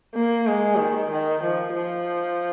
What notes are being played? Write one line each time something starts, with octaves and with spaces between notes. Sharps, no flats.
A#3
G#3
D#3
D#3
F3
F3